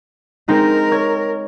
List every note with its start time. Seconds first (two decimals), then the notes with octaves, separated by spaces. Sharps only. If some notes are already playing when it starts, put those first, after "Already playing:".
0.48 G#3 C4 D#4 A#4
0.91 C#5 G#6